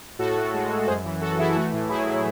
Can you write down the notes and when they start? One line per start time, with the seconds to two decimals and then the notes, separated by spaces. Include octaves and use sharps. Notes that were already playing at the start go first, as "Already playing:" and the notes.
0.19 A2 F#4 A4
0.37 A2
0.54 G#3
0.71 G#3
0.81 A4
0.87 F#2 G#4 C5
1.05 E3
1.21 F#2 F#4 A4
1.38 E3 E4 G#4
1.55 A3 F#4
1.73 A2
1.89 F#3 E4 G#4
2.06 F#3